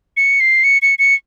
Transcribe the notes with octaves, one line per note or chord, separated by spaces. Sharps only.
C#7
C7
C#7
C#7
C#7